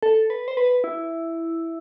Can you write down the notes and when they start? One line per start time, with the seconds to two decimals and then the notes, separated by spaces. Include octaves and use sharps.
0.03 A4
0.30 B4
0.48 C5
0.57 B4
0.84 E4